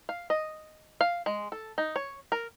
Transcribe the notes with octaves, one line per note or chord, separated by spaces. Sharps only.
F5
D#5
F5
G#3
A4
D#4
C#5
A#4